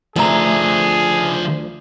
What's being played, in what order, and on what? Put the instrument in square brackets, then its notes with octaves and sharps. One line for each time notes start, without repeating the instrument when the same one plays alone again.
[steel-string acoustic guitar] D2 A#5 [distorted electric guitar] F3 E5 [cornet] G#4